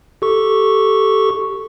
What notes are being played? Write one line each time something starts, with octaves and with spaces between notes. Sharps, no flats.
G4 A4 C#6